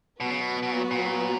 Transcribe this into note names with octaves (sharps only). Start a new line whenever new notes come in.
B2 F#3 B3 F#4 B4
C#3
B2
B2
A#2
A#2